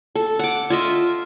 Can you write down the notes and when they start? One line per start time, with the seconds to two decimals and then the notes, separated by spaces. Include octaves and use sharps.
0.15 A4
0.39 F#5 D6
0.70 F4 D#5 E5